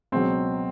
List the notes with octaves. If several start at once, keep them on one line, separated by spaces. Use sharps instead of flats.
C#2 B2 F#3 C4